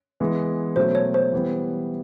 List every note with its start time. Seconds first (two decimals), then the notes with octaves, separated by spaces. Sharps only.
0.20 E3 G#3 B3
0.76 B2 F#3 A3 C#4 C5
0.95 C#5
1.14 C5
1.32 E3 G3 B3